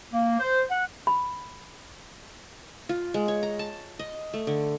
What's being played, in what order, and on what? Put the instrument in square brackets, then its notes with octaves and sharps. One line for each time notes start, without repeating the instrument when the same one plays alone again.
[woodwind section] A#3
C5
F#5
[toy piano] B5
[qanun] F4
G#3
C#5
A#5
A5
D#5
A3
D3